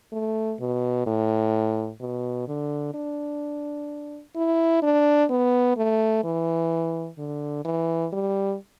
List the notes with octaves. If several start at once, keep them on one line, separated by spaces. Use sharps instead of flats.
A3
B2
A2
B2
D3
D4
E4
D4
B3
A3
E3
D3
E3
G3